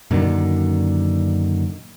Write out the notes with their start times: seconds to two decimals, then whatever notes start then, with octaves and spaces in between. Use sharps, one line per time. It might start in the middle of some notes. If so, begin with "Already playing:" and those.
0.11 F#2 A#2 D3 D#3